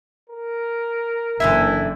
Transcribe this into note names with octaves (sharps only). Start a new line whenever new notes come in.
A#4
F#1 D3 E3 E4 E5